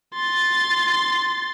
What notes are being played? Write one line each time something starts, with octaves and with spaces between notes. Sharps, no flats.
C6 A6